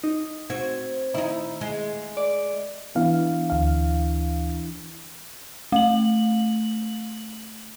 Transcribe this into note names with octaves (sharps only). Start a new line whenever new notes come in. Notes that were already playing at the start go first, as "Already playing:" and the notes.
D#4
C4 F#4 G#6
D#3 D#4 E4
G#3
D5
E3 B3 D4 E4 F5
D2 F5
A3 F#7